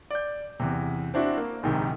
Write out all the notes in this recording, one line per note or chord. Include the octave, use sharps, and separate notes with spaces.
D5 G6
E2 C3
C4 D4 E4 F#4
A#3
A#1 G#2 C3 D#3